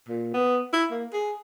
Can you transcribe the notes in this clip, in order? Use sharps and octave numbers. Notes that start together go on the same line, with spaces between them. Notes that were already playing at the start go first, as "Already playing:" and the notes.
A#2
B3
E4
A#3
G#4